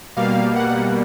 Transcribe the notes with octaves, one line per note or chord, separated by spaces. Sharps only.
B2 G3 A#3 F5
F#5